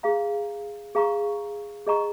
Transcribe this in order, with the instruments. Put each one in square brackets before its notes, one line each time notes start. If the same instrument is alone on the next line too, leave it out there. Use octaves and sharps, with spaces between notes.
[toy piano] G#4 F5 A#5
G#4 F5 A#5 C#6
G#4 D#5 A#5 C#6